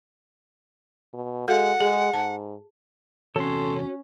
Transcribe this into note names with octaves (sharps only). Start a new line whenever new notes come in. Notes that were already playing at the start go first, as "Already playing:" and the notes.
B2
G#3 F#4 A4 F5 F#5
G#3 G#4
G#2 A5
E2 C3 C#4 F#4 A4 C#5 C6